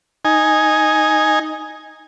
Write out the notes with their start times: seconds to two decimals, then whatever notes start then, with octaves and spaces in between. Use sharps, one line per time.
0.25 D#4 G#5